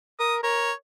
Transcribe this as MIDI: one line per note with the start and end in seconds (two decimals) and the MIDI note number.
0.20 0.43 70
0.20 0.35 87
0.43 0.71 70
0.43 0.72 73